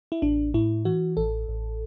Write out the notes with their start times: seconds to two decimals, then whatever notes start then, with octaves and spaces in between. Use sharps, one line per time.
0.12 E4
0.22 A1 D4
0.54 A2 E4
0.85 E3 F#4
1.17 A1 A4
1.49 A1